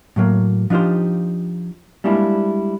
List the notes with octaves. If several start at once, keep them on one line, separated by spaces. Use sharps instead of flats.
A2 F#3 A#3
F3 D4 D#4 F4 G4 C5
G3 G#3 A#3 D4 E4 F4